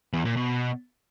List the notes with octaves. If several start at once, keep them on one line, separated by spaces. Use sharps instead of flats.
E2
A#2
B2